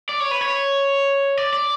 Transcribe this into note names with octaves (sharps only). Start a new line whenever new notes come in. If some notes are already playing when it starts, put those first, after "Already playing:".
D5
C#5
B4
C#5
D5
D5